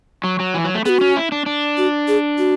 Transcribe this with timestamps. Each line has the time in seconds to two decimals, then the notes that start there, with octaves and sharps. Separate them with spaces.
0.24 F#3
0.40 F#3
0.54 E3
0.64 F#3
0.75 A3
0.85 B3 G#4
0.89 F#4
1.01 C#4
1.16 E4
1.32 D4
1.46 D4
1.78 F#4
2.08 G#4
2.38 F#4